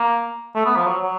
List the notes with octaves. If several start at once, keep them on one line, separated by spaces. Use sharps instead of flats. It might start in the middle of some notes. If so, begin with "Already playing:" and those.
Already playing: A#3
A3
B3
F3
F#3
F#3